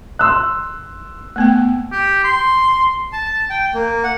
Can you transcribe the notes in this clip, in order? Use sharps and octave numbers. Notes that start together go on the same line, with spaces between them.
C6 E6 F#6
A3 B3 G5
G4
C6
A5
G5
A#3
F#5